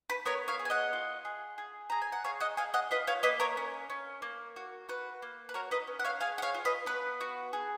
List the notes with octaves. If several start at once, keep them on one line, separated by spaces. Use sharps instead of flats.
B4
B3 A#4 C#5
C#5 F5
G#4
G#5
D#5 F#5
F4
G#4
G#4
G#4 A#5
G#5
F#5
G#4 C#5 F5
D#5 F#5
G#4 F5 G#5
D#5 F#5
F4 B4 D#5
C#5 F5
A#3 B4 D#5
A#4 C#5
C#4
C#4
A#3
F#4
F#4 B4
A#3
B4
F#4 A#4 C#5
B4 D#5
C#4
F#5
C#5 F5
G#4 F5 G#5
F#5
C#5 F5
F4
B4 D#5
B3 B4
F#4
G#4